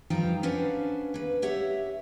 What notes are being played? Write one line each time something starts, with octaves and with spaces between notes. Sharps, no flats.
G2 F3 D#4 F5 G5 A#5
C#4 D4 B4 C5 F5 F#5
A#3 B4
G4 C#5 E5 F#5